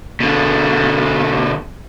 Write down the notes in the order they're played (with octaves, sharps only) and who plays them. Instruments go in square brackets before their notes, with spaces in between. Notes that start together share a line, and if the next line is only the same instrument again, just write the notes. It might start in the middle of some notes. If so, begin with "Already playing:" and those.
[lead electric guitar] B2 D3